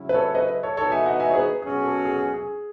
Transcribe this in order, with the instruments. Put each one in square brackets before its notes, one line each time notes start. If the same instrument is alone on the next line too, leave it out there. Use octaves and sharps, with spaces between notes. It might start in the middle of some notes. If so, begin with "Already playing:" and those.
Already playing: [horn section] C#3 F#3 C#4 E4
[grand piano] B4
A4 C#5
B4 D#5
A4 C#5
[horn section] E3 B3 D#4 F#4 [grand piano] A4 C#5
[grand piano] E5 G#5
D#5 F#5
E5 G#5
C#5
G#4 B4
[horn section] B2 F#3 C#4 F#4 [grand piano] G#4
[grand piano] A4
G#4
G#4
G#4